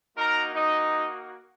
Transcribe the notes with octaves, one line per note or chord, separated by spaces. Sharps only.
A#3 D#4 F#4 A#4 A#5
D#4 D#5